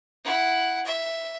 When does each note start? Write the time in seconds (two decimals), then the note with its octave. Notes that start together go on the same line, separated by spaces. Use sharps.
0.24 E4 F#5
0.85 E5